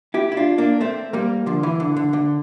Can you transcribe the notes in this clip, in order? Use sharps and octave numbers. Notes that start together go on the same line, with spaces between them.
E4 G4
E4
D4 F4
A#3 D4
A3 C4
G3 A#3
D3 F3
E3
D3
D3
D3